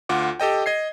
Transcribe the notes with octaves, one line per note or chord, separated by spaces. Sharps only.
D2 F4 F#5 D6
G4 A4 D#5 G5
D#5 G#6 C7